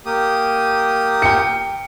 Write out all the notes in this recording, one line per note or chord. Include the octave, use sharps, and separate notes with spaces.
A#3 G4 D#6
G5 C#7